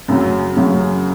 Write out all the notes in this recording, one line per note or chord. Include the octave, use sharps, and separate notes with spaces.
F#2 C#3 F#3
F#2 C#3 F#3